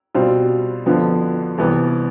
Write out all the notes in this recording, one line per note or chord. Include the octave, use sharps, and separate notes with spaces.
B2 G3 C4 F4
F2 D3 F3 B3 F4
C2 C3 E3 B3